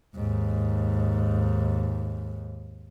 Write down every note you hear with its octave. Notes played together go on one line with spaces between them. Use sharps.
D#2 G#2